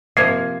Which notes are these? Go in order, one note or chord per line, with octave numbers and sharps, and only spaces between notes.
C3 F3 A#3 G#6 C7